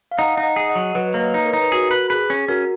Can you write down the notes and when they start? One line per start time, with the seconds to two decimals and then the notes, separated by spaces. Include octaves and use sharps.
0.11 F5
0.18 D#4 D#5 F#5
0.37 D#4
0.43 D#5 F#5
0.56 G#4
0.69 D#5 F#5
0.75 F#3
0.95 F#3 B4 D#5
1.07 B4
1.14 A#3 C#5
1.21 B4 D#5
1.34 D#4
1.46 A#4 C#5
1.53 D#4
1.61 B4
1.72 F#4 G#4 A#4
1.91 B4
2.10 G#4 B4
2.30 C#4
2.48 C#4 F#4 A#4